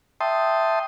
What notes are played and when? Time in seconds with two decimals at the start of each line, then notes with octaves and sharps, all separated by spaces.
0.21 E5 G5 A5 C6 D#6